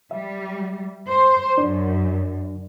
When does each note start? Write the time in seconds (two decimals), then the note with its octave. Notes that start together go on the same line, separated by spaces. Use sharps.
0.11 G3 E5
1.09 C5
1.58 F#2 D4 D5